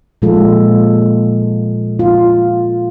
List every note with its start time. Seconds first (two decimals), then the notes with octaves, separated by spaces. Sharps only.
0.22 A#2 F3 G#3 F4 A4
1.99 F4